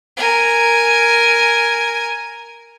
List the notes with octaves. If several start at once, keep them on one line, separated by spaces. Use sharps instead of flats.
A#4 G#5